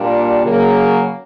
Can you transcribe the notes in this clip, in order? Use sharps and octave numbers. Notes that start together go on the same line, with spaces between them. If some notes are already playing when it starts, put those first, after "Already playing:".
Already playing: A#2 G3 A#3 D4
C#3 F#3 A#3